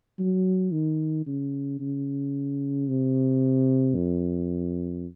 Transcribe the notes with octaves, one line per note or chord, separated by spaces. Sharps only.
F#3
D#3
C#3
C#3
C3
F2